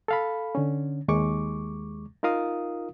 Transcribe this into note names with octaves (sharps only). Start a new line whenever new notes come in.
A4 F5 B5
D3 C#4
D#2 G#3 C#6 D6
D#4 F4 A#4 F5 D#6